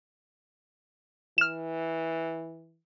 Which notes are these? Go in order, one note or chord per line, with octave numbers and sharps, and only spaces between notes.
E3 F6 E7